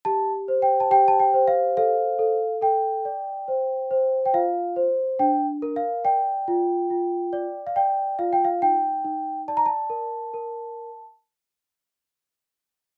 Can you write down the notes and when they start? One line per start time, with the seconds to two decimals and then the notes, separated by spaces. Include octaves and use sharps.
0.05 G4 A5
0.48 C5
0.62 G5
0.80 A5
0.91 G4 G5
1.08 A5
1.20 G5
1.34 C5
1.48 F5
1.77 A4 F5
2.19 A4
2.62 A4 G5
3.05 D5
3.48 C5
3.91 C5
4.26 G5
4.34 F4 F5
4.76 C5
5.19 D4 G5
5.62 A#4
5.76 F5
6.05 D5 G5
6.48 F4
6.90 F4
7.33 D5
7.67 F5
7.76 D5 G5
8.19 F4 F5
8.33 G5
8.44 F5
8.62 D#4 G5
9.05 D#4
9.48 D5 A5
9.57 A#5
9.66 A5
9.90 A#4
10.34 A#4